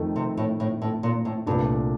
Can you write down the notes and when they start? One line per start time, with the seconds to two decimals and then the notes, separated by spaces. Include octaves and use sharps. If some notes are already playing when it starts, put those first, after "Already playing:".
Already playing: F2 D#3 A3
0.16 C3
0.37 A2
0.60 A2
0.82 A2
1.03 A#2
1.25 A2
1.46 C2 G2 A#2 A3 D4